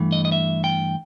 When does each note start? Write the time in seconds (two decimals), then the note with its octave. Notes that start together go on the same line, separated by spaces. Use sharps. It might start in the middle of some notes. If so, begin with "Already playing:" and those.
Already playing: G2 E3 A3
0.12 D#5
0.25 D#5
0.32 E5
0.64 G5